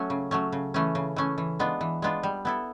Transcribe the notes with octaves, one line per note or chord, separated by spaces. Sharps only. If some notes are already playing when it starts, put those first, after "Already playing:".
Already playing: F#3 A3 C#4
C#3
F#3 A3 C#4
C#3
E3 A3 C#4
C#3
E3 A3 C#4
E3
G#3 B3 D4 F4
E3
G#3 B3 D4 F4
G3
B3 E4 A4